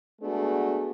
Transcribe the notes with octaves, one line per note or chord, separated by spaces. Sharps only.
G#3 A3 B3 D4 F#4 G#4